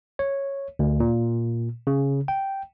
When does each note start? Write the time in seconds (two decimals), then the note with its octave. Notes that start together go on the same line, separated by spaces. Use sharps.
0.19 C#5
0.79 D2
1.00 A#2
1.87 C#3
2.28 G5